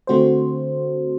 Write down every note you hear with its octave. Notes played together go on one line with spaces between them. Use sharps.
D3 A3 C4 F#4 C5